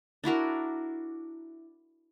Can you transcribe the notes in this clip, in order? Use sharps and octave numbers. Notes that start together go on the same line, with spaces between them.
D4 E4 F#4 A#4